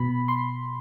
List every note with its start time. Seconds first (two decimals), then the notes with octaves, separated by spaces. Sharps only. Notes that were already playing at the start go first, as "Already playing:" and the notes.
Already playing: B2 B5
0.28 C6